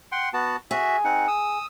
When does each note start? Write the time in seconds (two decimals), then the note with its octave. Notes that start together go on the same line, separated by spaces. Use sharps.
0.12 F#5 G5 C6
0.33 B3 F#4 A5
0.71 F#4 G#4 E5
1.05 C4 D#4 F#5
1.28 D#6 E6